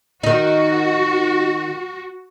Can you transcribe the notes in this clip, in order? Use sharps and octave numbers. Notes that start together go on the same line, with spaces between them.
D#3 D#4 F#4